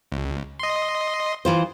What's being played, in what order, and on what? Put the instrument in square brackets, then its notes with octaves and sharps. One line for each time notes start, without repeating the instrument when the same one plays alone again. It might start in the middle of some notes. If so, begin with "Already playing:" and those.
[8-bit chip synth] C#2
D#5 C6
[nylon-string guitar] E3 F4 C5